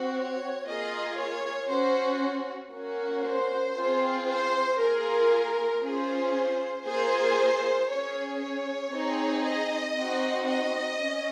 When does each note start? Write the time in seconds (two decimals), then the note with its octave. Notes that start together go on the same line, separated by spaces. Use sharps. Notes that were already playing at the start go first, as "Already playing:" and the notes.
Already playing: C4 F#4
0.15 C#5
0.66 A#3 F4 G#4 D#5
1.18 C#5
1.69 C#4 F#4 C5
2.73 A#3 C#4 F#4
3.25 C5
3.76 C4 F4 G#4
4.29 C5
4.80 A#3 F4 G#4 A#4
5.83 C#4 F4 G#4 C5
6.86 A#3 F4 G#4 C5
7.90 C#4 G#4 C#5
8.41 C#5
8.93 C4 D#4 G#4
9.45 D#5
9.96 C4 D#4 F#4
10.48 D#5
11.00 C#4